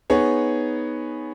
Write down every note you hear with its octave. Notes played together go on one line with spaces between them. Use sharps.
B3 D#4 G#4 C#5